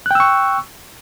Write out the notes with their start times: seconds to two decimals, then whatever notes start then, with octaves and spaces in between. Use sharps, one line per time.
0.06 F#6
0.11 G5
0.15 E6
0.20 C#6